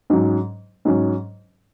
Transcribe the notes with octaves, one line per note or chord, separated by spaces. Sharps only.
G#2 F#3 C#4
G#2 F#3 C#4